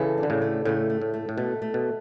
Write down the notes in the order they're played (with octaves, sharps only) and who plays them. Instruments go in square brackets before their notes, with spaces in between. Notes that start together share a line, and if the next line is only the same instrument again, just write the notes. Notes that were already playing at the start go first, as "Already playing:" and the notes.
Already playing: [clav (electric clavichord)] C#3 E3 [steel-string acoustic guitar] A4
[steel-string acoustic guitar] D4
[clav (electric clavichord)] D3
A2 C#3
[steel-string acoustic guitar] A3
[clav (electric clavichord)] A2 C#3 [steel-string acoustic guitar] A3
[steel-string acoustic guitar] A3
[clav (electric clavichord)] A2
[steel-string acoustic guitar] A3
[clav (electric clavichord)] A2
[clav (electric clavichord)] B2 [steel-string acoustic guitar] A3
[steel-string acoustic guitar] A3
[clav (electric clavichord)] B2